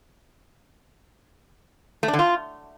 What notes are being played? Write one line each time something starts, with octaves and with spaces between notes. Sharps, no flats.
A3
D4
D3
F4